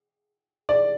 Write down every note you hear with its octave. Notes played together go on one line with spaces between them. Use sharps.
D5